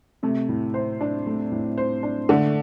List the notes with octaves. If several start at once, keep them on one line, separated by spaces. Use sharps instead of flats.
C3 A3
A2
C5
D4
A3
A2
C5
D4
D3 A3